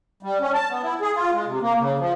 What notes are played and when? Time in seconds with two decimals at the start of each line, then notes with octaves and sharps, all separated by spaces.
0.23 G3
0.41 C#4
0.54 A5
0.70 B3
0.83 E4
1.01 G#4
1.16 F4
1.33 G#3
1.46 C3
1.62 A#3
1.80 C#3
1.99 F3